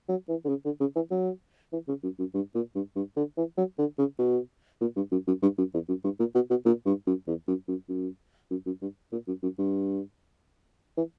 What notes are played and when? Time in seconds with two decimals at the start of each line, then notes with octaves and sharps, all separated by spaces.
0.09 F#3
0.29 E3
0.44 D3
0.49 C#3
0.65 D3
0.80 C#3
0.96 E3
1.11 F#3
1.73 E3
1.88 C#3
2.03 F#2
2.19 F#2
2.34 G2
2.55 A#2
2.75 G2
2.96 G2
3.17 D3
3.37 E3
3.57 F#3
3.78 D3
3.98 C#3
4.19 B2
4.81 A#2
4.96 G2
5.12 F#2
5.27 F#2
5.42 G2
5.58 F#2
5.73 E2
5.88 F#2
6.04 G2
6.19 A#2
6.35 B2
6.50 B2
6.65 A#2
6.86 G2
7.07 F#2
7.27 E2
7.48 F#2
7.68 F#2
7.89 F#2
8.51 F#2
8.66 F#2
8.82 G2
9.12 A#2
9.27 F#2
9.43 F#2
9.58 G2
10.97 E3